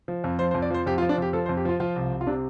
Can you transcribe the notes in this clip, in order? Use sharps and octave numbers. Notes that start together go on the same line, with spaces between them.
F3
F2
F3 C5
C5
F2
D5
F3 C5
F2 G4
F4
F3
D4
F2 G4
F3 A4
C5
F2
G4
F3 F4
F3 F4
C2
C2
F4
C3 D4